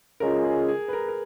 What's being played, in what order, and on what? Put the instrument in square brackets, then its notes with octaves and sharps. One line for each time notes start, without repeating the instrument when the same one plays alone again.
[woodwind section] C#3 G#3 C#4 F4 [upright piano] A#4
[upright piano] G#4
G#4
B4
A#4
A#4